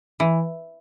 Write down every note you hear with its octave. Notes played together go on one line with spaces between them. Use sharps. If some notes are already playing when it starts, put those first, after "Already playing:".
E3